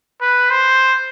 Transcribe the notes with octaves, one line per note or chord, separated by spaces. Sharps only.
B4
C5